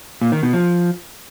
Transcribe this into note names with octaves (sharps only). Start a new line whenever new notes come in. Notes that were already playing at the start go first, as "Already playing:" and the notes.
A#2
D#3
B2
F3